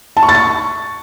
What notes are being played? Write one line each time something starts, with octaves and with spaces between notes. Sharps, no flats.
A5
C#6
A6
C#6